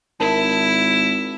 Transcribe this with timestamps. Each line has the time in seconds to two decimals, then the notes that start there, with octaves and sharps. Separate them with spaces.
0.20 G#1 E4 A#4 A5